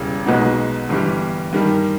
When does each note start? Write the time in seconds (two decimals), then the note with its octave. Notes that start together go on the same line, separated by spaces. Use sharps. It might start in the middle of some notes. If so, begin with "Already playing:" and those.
Already playing: E1 E2 C#3 G3
0.26 B1 B2 G#3 B3 D#4
0.89 G1 G2 E3 G3
1.53 G2 D#3 G3